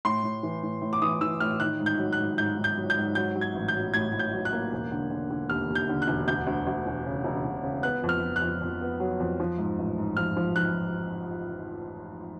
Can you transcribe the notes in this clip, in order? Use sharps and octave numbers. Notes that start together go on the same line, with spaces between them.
A2 C6
A2
E3
A2
A2
D6
E3 D#6
E3 E6
A2 F6
D#3 F#6
G#2
G6
F#3
F#6
G#2
G#2 G6
G#2
G6
F#3
G6
G#2
F#3 G6
F#3
G#6
A1
G6
F#3
A2 G#6
A2
G6
F#3
F#6
A#3
E1
D3
D3
D3
D#2 F6
D#2
G6
D3
F#6
E1
D2 G6
D2
D2
E1
C#3
E1
E1
C#3
B3 F#6
F2
F6
F2
F#6
F2
F2
B3
F#3
F2
F3
G#2
A1
G#2
F3 F6
F3
F3 F#6